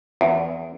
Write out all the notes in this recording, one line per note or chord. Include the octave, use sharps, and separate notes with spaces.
E2